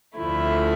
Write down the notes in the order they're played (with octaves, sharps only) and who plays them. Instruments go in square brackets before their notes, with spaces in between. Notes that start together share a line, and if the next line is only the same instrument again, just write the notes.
[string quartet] D2 D3 F3 A3 E4